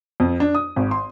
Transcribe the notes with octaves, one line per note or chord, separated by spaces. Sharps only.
F2
D4
D#6
G#1
C6